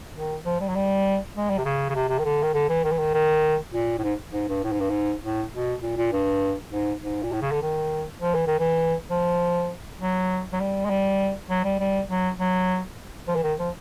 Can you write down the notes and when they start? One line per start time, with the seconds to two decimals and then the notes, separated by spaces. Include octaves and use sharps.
0.16 D#3
0.45 F3
0.60 G3
0.69 F#3
0.75 G3
1.36 G#3
1.50 G3
1.58 C3
1.65 C#3
1.89 C#3
1.95 C3
2.09 C3
2.19 D#3
2.24 D3
2.43 D#3
2.54 D3
2.69 E3
2.84 D#3
2.91 E3
2.99 D#3
3.14 D#3
3.74 A#2
3.98 A2
4.03 G#2
4.33 G#2
4.48 G2
4.63 A2
4.72 G#2
4.80 G2
4.89 G#2
5.23 A2
5.53 B2
5.82 A#2
5.97 A#2
6.12 G2
6.72 G#2
7.02 G#2
7.23 A#2
7.32 A2
7.42 C#3
7.52 D3
7.62 D#3
8.22 F3
8.34 E3
8.47 D#3
8.59 E3
9.10 F3
10.00 F#3
10.53 F#3
10.60 G3
10.85 G#3
10.90 G3
11.50 F#3
11.64 G3
11.80 G3
12.09 F#3
12.39 F#3
13.28 F3
13.35 E3
13.43 D#3
13.59 F3